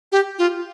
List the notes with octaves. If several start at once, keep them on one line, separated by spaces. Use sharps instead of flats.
G4
F4